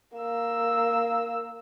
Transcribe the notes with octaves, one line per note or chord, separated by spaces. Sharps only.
A#3 E6